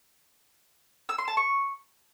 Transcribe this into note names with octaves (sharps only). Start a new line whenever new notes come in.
E6
C6
A5
C#6